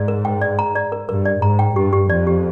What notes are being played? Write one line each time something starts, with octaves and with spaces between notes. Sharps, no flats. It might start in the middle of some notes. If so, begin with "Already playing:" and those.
Already playing: G#2 D5
A#4
G5
D5
A#5
D5
A#4
G2 A#4
D5
G#2 A#5
G5
G2 G4
G4
F2 D5
G4